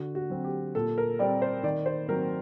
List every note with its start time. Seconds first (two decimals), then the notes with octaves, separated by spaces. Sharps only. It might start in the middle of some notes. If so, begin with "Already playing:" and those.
Already playing: D3 F#4
0.15 F#4
0.30 F#3 C4
0.44 G4
0.75 A#2 A4
0.98 A#4
1.19 G3 C4 D5
1.42 C5
1.63 D#3 D5
1.86 C5
2.08 F#3 C4 A#4